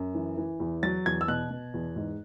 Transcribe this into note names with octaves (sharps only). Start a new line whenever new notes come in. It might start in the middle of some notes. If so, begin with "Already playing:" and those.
Already playing: F#2
E3
E3
E2
F#3 A6
E2 G#6
E6
B2 F#6
B2
E2
G#2